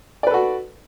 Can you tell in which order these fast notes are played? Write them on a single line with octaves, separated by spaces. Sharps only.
D5 B4 A4 F#4